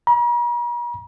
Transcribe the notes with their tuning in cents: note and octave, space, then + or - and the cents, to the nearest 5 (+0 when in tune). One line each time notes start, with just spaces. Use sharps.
A#5 +45